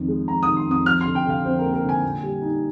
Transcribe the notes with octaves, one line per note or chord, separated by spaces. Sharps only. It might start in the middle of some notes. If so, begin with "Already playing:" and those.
Already playing: F2 D#3
G#3
F2 A#5
D#3 D#6
C6
F2 D#6
F3 F6
D3 C6
G5
D3 F5
F2 C5
A#4
A#3
A#4
D3
G#5
A#2
G3
D#4